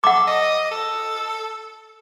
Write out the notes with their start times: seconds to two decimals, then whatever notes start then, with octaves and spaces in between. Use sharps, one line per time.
0.04 A4 F#5 D6
0.27 D#5
0.71 A4